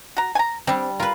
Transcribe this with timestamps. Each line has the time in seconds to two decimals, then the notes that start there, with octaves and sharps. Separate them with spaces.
0.17 F#4 A#5
0.35 G#5 A#5
0.67 G3 C4 D4
1.00 F4 A#4 B4